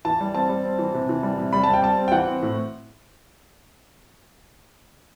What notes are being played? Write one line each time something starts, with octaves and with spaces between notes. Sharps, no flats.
E3 A5
G3
C4 A5
G3
C4
E3
C3
E3
G3
C3
G3 B5
C4 A5
G5
G3 A5
C4
G5
E3 F#5
C4
A2